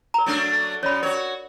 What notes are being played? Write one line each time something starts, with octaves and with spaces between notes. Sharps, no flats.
A#4 A#5
F#3 A3 D4
F#2 C#5 D5 B5
F#4 A#4 C#5